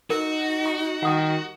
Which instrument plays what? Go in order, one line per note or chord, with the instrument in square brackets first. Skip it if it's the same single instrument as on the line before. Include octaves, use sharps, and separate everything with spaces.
[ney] D#4 [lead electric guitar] F#4 [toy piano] A#4
[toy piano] C#6
[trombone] D#3 [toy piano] F#5 D#6